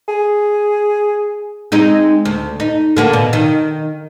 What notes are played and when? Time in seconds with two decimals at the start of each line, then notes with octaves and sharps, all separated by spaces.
0.08 G#4
1.72 G#3 C4 D#4
2.25 D2
2.60 D#4
2.97 D3 A#3 F#4
3.13 B2
3.33 D#3